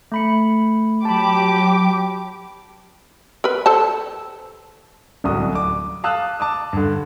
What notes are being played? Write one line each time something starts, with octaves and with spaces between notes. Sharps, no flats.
A3 B5 C#7
F#3 G4 A5 B5 D6
A#4 B4
A4 C5 A5
D1 C2 F#4 D#6
D6
F5 A5 D#6 E6 F#6
A5 D6 D#6
G2 D3